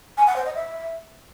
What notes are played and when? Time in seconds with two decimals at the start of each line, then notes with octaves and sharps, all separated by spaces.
0.17 G#5
0.27 F#5
0.36 C5
0.46 D#5
0.55 E5